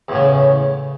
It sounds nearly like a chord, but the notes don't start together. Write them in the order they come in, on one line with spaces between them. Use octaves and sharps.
E2 A2 C#3